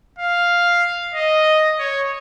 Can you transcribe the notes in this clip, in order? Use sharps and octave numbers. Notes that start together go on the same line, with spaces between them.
F5
D#5
C#5